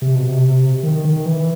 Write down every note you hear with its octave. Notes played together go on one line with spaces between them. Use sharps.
C3
B2
C3
D#3
D#3
E3